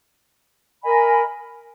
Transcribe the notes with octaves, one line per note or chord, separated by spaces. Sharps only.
A#4 D#5 G#5 B5